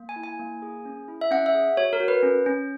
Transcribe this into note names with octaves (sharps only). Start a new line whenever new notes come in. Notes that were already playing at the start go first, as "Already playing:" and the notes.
Already playing: A#3
G#5
E4
G#5
A#3
G#4
C#4
E4
E5
C#4 F#5
E5
G#4
F#4 C#5
A#4
F#4
B4
C#4
C#4